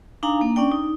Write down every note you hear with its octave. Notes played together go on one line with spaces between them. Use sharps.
D4 D#4 F5 G#5 A#5
A#3
C#4 D4 D5 G5
D#4